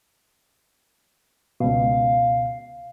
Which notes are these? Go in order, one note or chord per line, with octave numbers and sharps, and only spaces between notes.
C#2 B2 F5